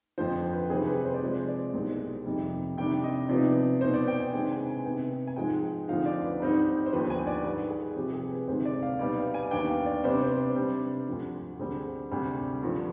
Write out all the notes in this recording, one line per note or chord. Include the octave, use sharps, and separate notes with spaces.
F2 D3 F3 C5
B4
C3 D#3 G3 C4 D#4 G#4
B4
C5
D5
C3 F3 G#3 C5
D5
C2 B2 G#3 C4 D#4
F2 C3 D#3 G3
C3 D#3 G3 D4 G5
D#5
C3 F3 B3 D#4 D5
B2 B3 D#4 C5
D5
G5
G#5
C3 D#3 G#3 D4 G5
G#5
G#5
C3 D#3 B3 G5
G#5
G#2 F3 G#3 G5
D2 D3 F3 C4 D#4 F5
D5
B4
G#2 G3 C4 D#4
C5
D#2 D3 F3 B3 B4
G#5
D5
G#2 D#3 G3 B4
G#4
C3 F3 C4 G4
G#4
B4
D2 C3 D#3 G#3 C5
D5
F5
B2 G3 B3 D#4 D5
F5
G#5
D#2 D#3 B3 D4 G5
F5
D5
C3 G3 B3 D4 C5
D5
C5
C3 G3 D4
D2 D3 F3
D2 D3 G3 C4 G#4
D2 C3 G3 D4
G2 D3 F3